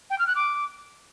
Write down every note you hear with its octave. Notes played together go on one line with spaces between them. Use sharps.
G5
F6
F#6
D6